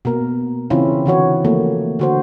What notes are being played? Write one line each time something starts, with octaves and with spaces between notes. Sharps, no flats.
B2 A#3 A#4
C#3 E3 C4 C#4 E4 F4
D3 E3 F#4 C#5
F3 A3 A#3
D3 F#4 C5